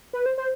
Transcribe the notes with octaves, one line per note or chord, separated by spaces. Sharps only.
B4
C5
C5